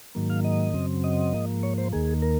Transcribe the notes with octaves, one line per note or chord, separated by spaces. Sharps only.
G#2 D#3 F#3 A#3
F5
D#5
F#2 C#3 F#3 C4
D#5
G#2 F3 A#3
C#5
C5
D#2 D#3 A#3 G#4
A#4